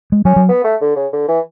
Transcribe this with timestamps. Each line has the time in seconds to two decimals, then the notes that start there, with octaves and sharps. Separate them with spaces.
0.12 G#3
0.25 F#3 C#4
0.36 F#3
0.49 B3
0.64 A3
0.81 D3
0.96 C#3
1.13 D3
1.28 E3